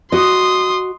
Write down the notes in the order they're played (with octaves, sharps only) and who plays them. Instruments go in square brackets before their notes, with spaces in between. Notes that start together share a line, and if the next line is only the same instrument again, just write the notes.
[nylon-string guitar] F#4 D#5 [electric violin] C6 D#6